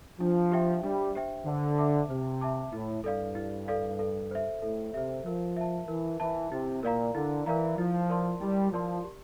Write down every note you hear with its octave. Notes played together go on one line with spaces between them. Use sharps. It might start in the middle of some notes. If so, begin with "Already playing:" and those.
F3 D4
G4 C5 E5 G5
G3 D4
G4 C5 E5 G5
D3 C5
E5 A5 D6
C3 C5
E5 A5 D6
A2 E4
G2 A4 D5 F5
E4
A4 D5 F5
A4
C5 E5
A2 A4
C3 C5 E5
F3 A#4
E5 A5
E3 A#4
E3 E5 A5
C3 E4
A#2 A#4 D5 F5 A#5
D3 E4
E3 A#4 D5 F5 A#5
F3 E4
A#4 D5 A5 C6
G3 E4
F3 A#4 D5 A5 C6
G4